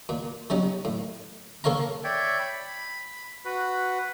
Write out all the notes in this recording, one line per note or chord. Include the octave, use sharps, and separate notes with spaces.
A#2
F#3 G3 C#4 D#4
A2
A#3 A4 C#5 F5 A#5
C#5 D5 E5 G5
B5
F#4 B4